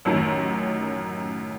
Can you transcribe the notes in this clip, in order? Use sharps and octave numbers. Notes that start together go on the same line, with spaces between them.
A1 F#2 D#3